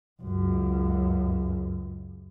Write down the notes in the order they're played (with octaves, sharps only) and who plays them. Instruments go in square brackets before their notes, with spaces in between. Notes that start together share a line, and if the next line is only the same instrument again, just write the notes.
[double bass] C#2 F#2